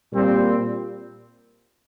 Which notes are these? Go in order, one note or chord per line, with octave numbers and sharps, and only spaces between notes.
A#2 G3 C4